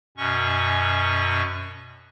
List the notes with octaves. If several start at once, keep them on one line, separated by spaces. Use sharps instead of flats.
F#2 B2 C#4 C#6